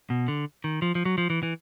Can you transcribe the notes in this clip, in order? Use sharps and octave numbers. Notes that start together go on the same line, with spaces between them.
B2
D3
D#3
F3
F3
F#3
F3
E3
E3